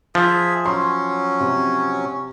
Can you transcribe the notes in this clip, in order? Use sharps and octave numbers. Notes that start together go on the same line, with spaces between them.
F3 G#4 E5
F#3 C#4 C6
C3